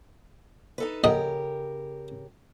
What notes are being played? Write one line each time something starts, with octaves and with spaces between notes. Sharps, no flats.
D#4 A4 B4
A#1 C#3 G4 A#4 D#5 F#5